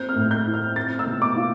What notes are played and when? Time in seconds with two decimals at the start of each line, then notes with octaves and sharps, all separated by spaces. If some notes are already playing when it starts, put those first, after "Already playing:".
Already playing: C4 G6
0.09 F6
0.16 A2
0.31 G6
0.46 E4
0.54 F6
0.76 C4 A6
0.99 E6
1.07 B2
1.22 D6
1.37 F4